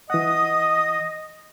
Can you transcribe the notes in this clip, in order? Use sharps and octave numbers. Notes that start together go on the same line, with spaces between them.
E3 D#5 F#5 D#6